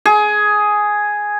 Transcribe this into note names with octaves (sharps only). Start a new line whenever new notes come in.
G#4